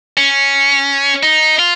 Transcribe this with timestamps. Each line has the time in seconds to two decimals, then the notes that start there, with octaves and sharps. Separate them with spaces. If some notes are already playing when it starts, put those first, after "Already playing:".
0.17 C#4
1.23 D#4
1.59 F4